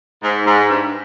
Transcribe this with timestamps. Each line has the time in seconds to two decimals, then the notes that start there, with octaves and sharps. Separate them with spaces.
0.23 G#2
0.46 G#2
0.69 G2